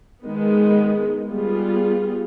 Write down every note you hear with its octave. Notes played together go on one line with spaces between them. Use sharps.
D#3 G#3 B3
G3 B3 F4 G#4